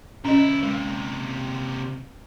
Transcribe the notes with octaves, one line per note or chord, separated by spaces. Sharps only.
B1 C#4 E4 D#5
C3 G#3 A#3